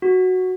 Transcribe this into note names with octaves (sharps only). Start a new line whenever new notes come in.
F#4